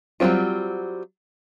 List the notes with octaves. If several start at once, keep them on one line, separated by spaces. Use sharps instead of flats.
F#3 G3 A3 C4 F4